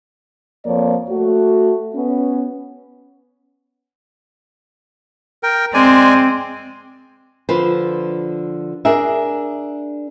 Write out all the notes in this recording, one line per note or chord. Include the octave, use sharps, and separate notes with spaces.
F2 F3 A#3 C#5 D5
A3 F#4
B3 C#4
A#4 G5
G#3 C4 D5 G#5
D3 F3 B4 C5
D4 G#4 A#4 E5